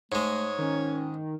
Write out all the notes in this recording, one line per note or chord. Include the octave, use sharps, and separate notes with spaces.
G#2 G#3 A3 C#5
D#3 C#4